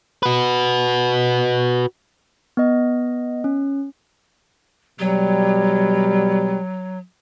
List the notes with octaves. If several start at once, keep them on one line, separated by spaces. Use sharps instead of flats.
F#4 B4
B3 D#5
C#4
B2 F#3 G3